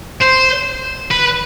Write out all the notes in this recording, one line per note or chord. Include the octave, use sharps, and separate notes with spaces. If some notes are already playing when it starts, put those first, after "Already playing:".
C5
B4